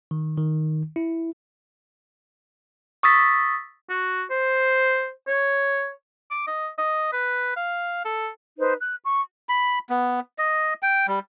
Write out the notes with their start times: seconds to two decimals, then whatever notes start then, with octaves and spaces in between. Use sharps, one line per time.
0.11 D#3
0.38 D#3
0.96 E4
3.03 C#6 D#6 E6 A6 B6
3.89 F#4
4.30 C5
5.28 C#5
6.31 D6
6.47 D#5
6.78 D#5
7.13 B4
7.56 F5
8.05 A4
8.58 D#4 B4 C5
8.80 F#6
9.06 C#6
9.49 B5
9.90 B3
10.38 D#5
10.83 G5
11.07 G3